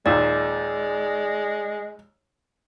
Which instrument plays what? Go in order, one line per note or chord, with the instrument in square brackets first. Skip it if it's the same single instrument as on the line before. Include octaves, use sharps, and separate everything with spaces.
[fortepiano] D#2 A#2 [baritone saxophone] G#3 [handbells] D5